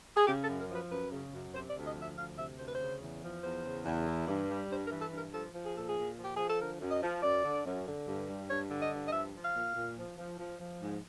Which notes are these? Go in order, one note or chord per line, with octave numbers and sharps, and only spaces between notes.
G#4
C#3 G4
A4
F#2
A#4
F3
B4
F#2 B4
C#3
F#2
C3 C5
D5
D2
D#5
F3
E5
D2 F5
C3 E5
D2 C5
B4
C5
C#3
E2
F3
E2 C5
C#3
E2
E3
G2
G3
G2 C5
A#4
E3
A4
G2
A#4
F3 A4
F3
G#4
A#2 A4
G#4
A#2
F3
G4
F3 G#4
A4
D3 A#4
F#2
D#5
F3
F#2 D5
D3
F#2
D3
G2
G3
G2 C#5
D3
D#5
G2
D#5
F3 E5
F3
F5
A#2
A#2
F3
F3
F3
F3
G#2